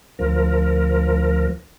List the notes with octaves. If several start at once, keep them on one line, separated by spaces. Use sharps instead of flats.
D2 F3 A#4